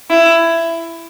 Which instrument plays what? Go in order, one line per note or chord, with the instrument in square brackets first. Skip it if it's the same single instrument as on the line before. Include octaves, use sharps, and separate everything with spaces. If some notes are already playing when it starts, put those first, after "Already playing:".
[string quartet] E4